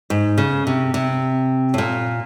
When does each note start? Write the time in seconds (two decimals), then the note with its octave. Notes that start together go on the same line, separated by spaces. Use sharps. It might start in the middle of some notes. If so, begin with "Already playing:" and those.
0.10 G#2
0.38 C#3
0.67 C3
0.94 C3
1.74 A2
1.78 A#2